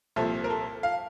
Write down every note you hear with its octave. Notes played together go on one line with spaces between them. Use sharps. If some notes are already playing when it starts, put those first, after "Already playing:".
C2 A#2 F3 A4
A#4
A4
F5